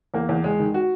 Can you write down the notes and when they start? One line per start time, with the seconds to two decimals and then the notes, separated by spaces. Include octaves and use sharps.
0.14 E2 A#3
0.29 E2
0.44 E2 G#3
0.60 D#3
0.74 F#4